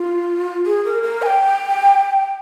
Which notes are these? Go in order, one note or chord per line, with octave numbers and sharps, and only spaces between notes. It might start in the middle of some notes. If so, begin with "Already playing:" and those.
Already playing: F4
G#4
A#4
A#4
G#5
G5